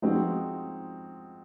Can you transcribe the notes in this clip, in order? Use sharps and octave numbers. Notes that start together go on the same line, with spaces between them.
F3 G#3 C4 D#4 F#4